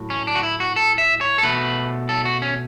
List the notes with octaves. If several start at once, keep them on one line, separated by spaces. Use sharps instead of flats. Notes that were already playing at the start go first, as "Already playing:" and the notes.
Already playing: A2 F#3
C#4
D4
F#4
E4
F#4
A4
E5
C#5
A4
B2 A3 B4
A4
F#4
C#4